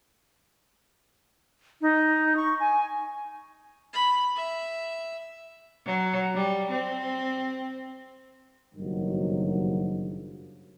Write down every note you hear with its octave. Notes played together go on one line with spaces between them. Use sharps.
D#4
C#6
G#5
B5
E5
F#3
G3
C4
F#1 G2 B2 D#3 F3 F#3